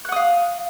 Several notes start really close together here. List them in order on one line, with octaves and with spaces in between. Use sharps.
F#6 F#5 D#6 F5